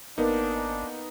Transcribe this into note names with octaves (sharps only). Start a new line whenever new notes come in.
G#1 A#3 B3 D4 D#4